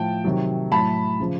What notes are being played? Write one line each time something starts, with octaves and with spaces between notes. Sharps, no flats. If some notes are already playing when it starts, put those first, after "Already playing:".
Already playing: A2 F3 G5 A5
C3 D#3 F#3
A2 F#3 A5 B5
C#3 F3